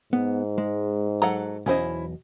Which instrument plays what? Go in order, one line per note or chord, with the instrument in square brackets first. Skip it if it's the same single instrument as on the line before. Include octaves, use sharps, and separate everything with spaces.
[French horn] G#2 [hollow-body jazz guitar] B3
[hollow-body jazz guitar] G#3
[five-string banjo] F#3 A4 F#5 [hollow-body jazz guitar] A#5
[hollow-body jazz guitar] B1 E2 D#5 [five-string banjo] C#4 E4 C5